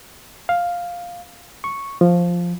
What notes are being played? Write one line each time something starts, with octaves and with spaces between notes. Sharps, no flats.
F5
C#6
F3